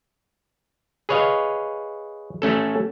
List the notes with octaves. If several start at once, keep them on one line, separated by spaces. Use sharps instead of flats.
G#4 B4 C#5 D#5 F5
A3 C#4 A4